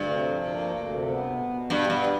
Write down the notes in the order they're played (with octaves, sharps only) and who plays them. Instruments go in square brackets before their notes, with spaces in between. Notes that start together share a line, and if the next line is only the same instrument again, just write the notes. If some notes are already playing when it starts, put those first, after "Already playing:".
Already playing: [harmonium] D2 [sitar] G2
[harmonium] C3
F3
A#3
D2
C3
B3
B2
B2
[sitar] G2 [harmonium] G3
[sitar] G2 [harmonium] B3